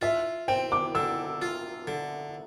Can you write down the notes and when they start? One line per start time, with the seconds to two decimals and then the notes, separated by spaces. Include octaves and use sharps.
0.01 F4 E5
0.48 C4 G5
0.72 D6
0.95 D3 E6
1.42 F4
1.87 D3